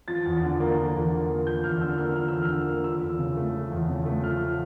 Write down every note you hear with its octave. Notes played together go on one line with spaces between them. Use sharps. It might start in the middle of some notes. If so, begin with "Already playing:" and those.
F3 A6
E2
D3
A#3
F3
E2
D3
A#3
F3 G6
E2 F6
D3 E6
A#3 F6
F3 F6
E2 E6
F6
D3
A#3
F3 E6
E2
C#3
A3
F3
E2
C#3
A3
F3 F6